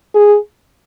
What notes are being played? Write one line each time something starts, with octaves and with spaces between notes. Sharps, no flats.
G#4